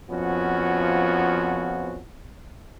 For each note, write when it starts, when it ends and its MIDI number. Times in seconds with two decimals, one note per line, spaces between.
0.10 1.97 41
0.10 1.97 53
0.10 1.97 59
0.10 1.97 61
0.10 1.97 66